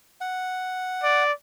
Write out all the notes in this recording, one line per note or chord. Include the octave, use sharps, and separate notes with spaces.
F#5
D5